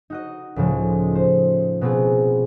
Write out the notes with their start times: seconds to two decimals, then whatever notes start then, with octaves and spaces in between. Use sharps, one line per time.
0.10 D#4 F#4 D#5
0.56 C#2 A2 C#3 F3
1.15 C5
1.81 B2 B3 C4 F4 G#4